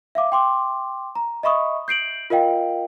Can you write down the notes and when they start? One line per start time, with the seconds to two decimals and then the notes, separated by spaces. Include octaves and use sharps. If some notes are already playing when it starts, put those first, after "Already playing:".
0.15 E5 F5 D6
0.32 G5 C6 D6
1.15 A#5
1.43 D#5 E5 B5 C#6 D#6
1.88 G6 C7 D7 F#7
2.30 F4 A#4 D#5 F5 G5